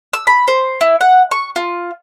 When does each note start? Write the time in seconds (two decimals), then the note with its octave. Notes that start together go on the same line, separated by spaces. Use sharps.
0.13 E6
0.27 B5
0.48 C5
0.81 E4
1.01 F#5
1.31 C#6
1.56 F4